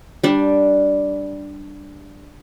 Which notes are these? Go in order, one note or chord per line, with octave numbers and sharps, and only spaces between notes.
G3 D4